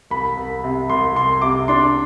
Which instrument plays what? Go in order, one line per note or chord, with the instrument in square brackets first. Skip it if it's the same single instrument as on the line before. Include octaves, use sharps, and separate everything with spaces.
[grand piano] C2 B5
C2
C3
C2 C6
C2 C6
C3 D6
D4 C6